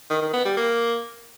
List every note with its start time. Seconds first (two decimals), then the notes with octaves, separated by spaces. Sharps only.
0.10 D#3
0.22 D#3
0.34 B3
0.45 G3
0.57 A#3